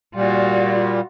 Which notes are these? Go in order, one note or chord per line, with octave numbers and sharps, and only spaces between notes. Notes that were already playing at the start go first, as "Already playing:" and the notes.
A#2 G3 F4 F#4